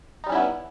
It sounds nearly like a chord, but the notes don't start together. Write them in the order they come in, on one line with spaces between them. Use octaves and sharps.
D#4 G3 C#4 E4 B3